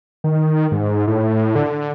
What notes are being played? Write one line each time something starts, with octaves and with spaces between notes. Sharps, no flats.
D#3
G#2
A2
D3